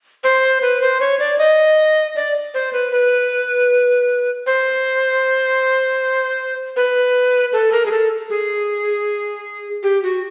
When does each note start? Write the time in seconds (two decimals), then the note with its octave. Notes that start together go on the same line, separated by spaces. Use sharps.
0.24 C5
0.62 B4
0.81 C5
1.00 C#5
1.19 D5
1.38 D#5
2.16 D5
2.54 C5
2.73 B4
2.92 B4
4.46 C5
6.76 B4
7.53 A4
7.72 A#4
7.86 G#4
7.91 A4
8.30 G#4
9.83 G4
10.03 F#4